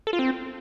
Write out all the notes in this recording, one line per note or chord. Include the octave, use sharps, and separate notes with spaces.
A4
F4
C4